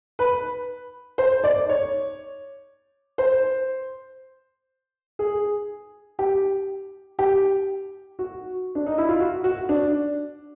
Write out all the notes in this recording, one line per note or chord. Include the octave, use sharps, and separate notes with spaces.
B4
C5
D5
C#5
C5
G#4
G4
G4
F#4
D4
D#4
E4
F4
F#4
F#4
D4